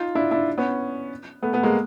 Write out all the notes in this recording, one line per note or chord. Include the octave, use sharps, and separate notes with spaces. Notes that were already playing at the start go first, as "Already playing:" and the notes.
Already playing: D#4 F4
D4 E4
D4 E4
B3 C#4
A3 B3
A3 B3
G#3 A#3